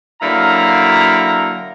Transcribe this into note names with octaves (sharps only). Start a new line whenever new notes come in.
D3 F#3 A#3 E4 F5 A#5